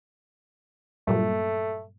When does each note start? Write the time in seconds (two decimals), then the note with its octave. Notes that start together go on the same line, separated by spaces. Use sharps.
1.07 G2 A#2 F#3 A3